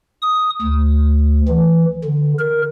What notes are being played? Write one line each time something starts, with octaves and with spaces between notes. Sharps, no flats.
D#6
D2
E3
D3
A#4